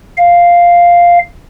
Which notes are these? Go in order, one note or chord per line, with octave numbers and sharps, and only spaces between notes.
F5